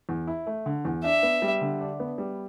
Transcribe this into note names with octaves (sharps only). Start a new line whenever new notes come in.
E2
E4
A3
D3
E2
D4 E5
B3
G3
D3
D4
B3
G3